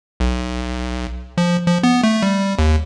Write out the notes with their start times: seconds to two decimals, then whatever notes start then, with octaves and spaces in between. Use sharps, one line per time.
0.20 B1
1.38 F3
1.67 F3
1.83 B3
2.04 A3
2.23 G3
2.59 D#2